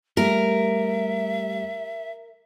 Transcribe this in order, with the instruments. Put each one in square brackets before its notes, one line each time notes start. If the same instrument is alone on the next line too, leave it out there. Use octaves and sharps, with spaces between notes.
[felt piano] G3 A3 G4 [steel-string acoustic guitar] A#4 [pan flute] E5